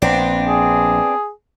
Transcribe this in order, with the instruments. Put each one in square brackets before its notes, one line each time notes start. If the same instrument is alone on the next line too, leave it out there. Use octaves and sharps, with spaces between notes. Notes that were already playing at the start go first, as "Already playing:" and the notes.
[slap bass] A#1 [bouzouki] B3 C4 D4
[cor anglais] G#4